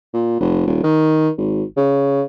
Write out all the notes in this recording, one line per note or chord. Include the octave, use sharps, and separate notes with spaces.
A#2
F1
D#1
D#3
G#1
C#3